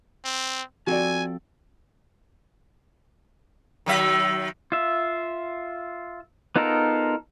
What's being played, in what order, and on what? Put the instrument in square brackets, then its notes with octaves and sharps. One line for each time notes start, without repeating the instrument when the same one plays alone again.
[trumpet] C4
[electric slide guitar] F3 C4 A4 [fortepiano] F#4 D5 [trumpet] G#5
[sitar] D#3 F#3 E5
[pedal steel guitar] F4 E5
B3 D#4 F4 A4 A#4